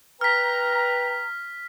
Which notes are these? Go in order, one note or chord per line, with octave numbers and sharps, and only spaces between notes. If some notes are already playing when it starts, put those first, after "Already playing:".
B4 G5 A#5 F6 B6